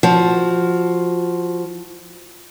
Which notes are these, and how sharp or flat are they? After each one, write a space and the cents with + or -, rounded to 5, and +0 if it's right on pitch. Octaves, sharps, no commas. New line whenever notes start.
F3 +0 F#4 -10